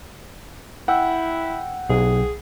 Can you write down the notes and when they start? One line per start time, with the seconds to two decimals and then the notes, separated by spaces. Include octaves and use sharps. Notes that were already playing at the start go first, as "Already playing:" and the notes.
0.88 E4 F#5 G5 E6
1.89 B1 G#4